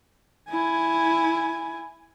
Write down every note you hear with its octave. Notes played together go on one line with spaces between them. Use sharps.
E4 G#5